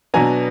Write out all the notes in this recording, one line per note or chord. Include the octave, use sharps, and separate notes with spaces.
B2 F#3 B3 D4 G#5 A#5